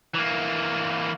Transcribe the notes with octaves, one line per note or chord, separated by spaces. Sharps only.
E3 A#3